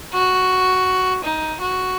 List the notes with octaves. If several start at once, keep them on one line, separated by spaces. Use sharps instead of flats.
F#4
D#4
F#4